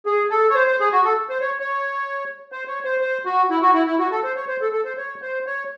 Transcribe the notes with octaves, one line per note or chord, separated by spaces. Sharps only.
G#4
A4
C#5
C5
C5
G#4
F#4
A4
C5
C#5
C#5
C5
C#5
C5
C5
F#4
E4
F#4
E4
E4
F#4
A4
C5
C#5
C5
A4
A4
C5
C#5
C5
C#5